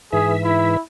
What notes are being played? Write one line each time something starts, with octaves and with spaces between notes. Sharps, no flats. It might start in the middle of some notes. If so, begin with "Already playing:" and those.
G#2 E3 G#4 E5
E4